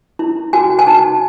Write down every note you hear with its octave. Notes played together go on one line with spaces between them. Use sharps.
E4
F#4 G#5
G#5
D#4 A5